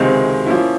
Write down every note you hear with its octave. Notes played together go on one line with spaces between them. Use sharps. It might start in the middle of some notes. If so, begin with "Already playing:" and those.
Already playing: C#2 C3 D#3 G#3 C4
F3 A#3 C#4 E4